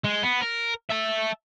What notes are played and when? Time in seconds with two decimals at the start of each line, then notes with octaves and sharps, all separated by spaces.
0.04 G#3
0.23 B3
0.41 A#4
0.90 E5 A5